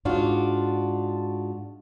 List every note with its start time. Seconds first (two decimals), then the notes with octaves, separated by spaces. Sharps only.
0.05 G#2 D4 F4 F#4